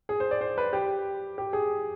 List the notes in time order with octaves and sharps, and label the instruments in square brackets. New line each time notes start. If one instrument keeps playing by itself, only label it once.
[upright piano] G#4
C5
D5
C5
B4
G4
G4
G#4